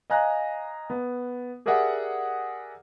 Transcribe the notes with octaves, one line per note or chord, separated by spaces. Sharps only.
D#5 F5 G#5 A#5 F#6
B3
G4 G#4 A#4 D5 E5 F#5